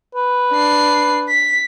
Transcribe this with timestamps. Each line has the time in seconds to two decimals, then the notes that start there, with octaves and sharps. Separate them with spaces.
0.15 B4
0.52 D4 C7
1.29 B6